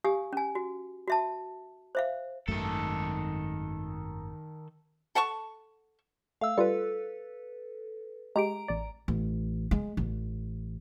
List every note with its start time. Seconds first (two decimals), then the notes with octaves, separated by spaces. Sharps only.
0.05 G4 F5 G#5 D#6
0.33 C#4 G#5
0.55 F#4
1.08 F#4 E5 A5
1.95 C5 E5 F5
2.48 G#1 F#2 D#3 A3 A4
5.15 A4 F#5 A5 C#6
6.41 A3 F5 E6
6.58 G3 F4 A4 B4
8.36 G#3 G4 A#5 D7
8.68 A1 D5
9.08 A1
9.71 G#3
9.97 A1